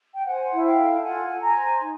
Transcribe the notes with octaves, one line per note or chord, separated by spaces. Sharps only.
G5
C5 F#5 G#5
E4
F5 G5
A4
F4 F#5 G#5
A4
G#5 A#5
C5
D#4